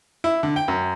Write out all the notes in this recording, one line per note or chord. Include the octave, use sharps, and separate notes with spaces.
E4
D3
G5
F#2